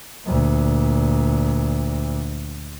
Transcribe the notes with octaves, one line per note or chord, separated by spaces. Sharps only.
D2 A#2